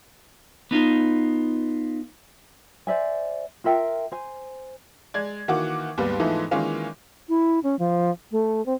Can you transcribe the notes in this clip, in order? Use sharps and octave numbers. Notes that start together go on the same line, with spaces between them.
B3 D#4 F4
C5 D5 E5 G#5
F4 A#4 E5 G5
C5 G#5
G#3 D5 G#6
D#3 E3 A#3 F#4 F#5 D6
D#2 G#2 G3 B3
G#2 E3 F3 A3 B3 D#4
D#3 E3 G#3 A#3 C#4 F4
E4
C#4
F3
A3
C4